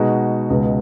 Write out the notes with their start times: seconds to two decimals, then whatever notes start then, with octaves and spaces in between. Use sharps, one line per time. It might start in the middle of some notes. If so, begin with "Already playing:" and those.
Already playing: B2 G#3 D#4 F#4
0.50 C#2 B2 G#3